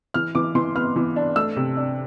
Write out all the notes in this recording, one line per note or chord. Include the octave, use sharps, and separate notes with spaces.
E3 F6
E3 D6
E3 C6
B3 F6
E3
D4
A3 E6
C3
D4